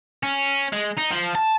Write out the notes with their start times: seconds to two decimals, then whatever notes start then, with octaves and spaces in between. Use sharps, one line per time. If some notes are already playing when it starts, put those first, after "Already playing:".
0.23 C#4
0.72 G#3
0.97 D#4
1.11 F3
1.35 A5